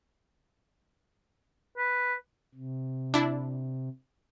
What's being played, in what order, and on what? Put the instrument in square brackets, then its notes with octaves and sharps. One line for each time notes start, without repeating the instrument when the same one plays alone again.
[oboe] B4
[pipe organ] C3
[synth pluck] D4 E4